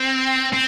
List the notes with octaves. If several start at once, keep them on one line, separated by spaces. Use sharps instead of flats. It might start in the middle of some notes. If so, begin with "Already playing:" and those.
Already playing: C4
C4